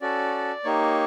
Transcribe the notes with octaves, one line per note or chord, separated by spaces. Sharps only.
C#4 F#4 A4 D5
A#3 D#4 G4 C#5